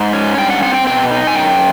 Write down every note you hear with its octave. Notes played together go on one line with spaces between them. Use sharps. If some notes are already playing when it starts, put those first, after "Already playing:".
Already playing: G#2
C#4
G2 G5
F#5
C4 F#5
G5
B2 G5
D#4
G#5
F#2 G5